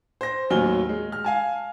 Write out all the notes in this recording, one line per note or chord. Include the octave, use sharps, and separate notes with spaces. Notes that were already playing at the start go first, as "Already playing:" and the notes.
C5 A#6
A1 D#2 F#3 G#5 F6 G7
G#3
F6
F5 G#5 A5